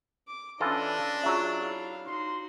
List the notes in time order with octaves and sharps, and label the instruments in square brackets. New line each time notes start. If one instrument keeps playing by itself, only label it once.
[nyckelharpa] D6
[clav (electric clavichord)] E3 F4 A4 [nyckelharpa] C#4 D#5 [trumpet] D4
[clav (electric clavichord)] F#3 E5 [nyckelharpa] F4 G#4
[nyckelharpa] E4 F5
[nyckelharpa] D#4 F#4 [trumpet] C6